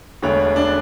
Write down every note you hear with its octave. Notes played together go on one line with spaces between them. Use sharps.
E1 D2 D3 C#5
C#5
D4